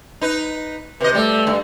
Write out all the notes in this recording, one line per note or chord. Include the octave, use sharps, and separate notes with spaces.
D#4 B4
C3 B4 D#5
G3 A3
G2